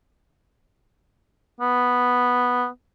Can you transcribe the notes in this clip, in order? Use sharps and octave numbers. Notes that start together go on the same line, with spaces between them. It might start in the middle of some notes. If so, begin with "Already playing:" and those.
B3